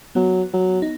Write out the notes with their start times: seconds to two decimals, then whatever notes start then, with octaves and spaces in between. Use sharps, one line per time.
0.15 F#3 B3
0.54 F#3
0.82 D#4